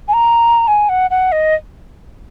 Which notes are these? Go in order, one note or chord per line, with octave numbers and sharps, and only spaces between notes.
G#5
A#5
G#5
F#5
F#5
D#5